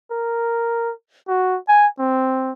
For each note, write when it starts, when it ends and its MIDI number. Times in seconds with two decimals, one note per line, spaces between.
0.11 0.93 70
1.28 1.58 66
1.68 1.87 80
1.99 2.53 60